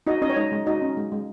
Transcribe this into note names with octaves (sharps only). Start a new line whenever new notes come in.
D#4 F#4 D#5
C#4 D#4 D#5
C#5
G#3 D#4 D#5
G#3
D#4 F#4 D#5
C#4
G#3
G#3